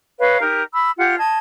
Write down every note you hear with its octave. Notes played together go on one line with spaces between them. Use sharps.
B4 C#5 D#5 F5
D#4 G4 A#4
B5 E6
F4 G4 F#5
D#5 A5 G#6